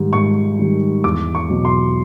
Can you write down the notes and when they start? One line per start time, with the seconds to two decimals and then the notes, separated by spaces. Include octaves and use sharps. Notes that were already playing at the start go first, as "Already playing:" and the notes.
Already playing: G#2 D#3 G3
0.13 G#2 C#6
0.59 D#3 G3
1.04 E2 D6
1.35 C#6
1.50 B2 F#3
1.65 C6